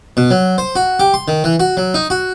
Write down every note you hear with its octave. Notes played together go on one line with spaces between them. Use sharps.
B2
F#3
C5
F#4
G4
C6
D#3
E3
F#4
F#3
D#4
F#4